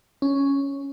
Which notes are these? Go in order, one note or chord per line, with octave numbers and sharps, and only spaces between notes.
C#4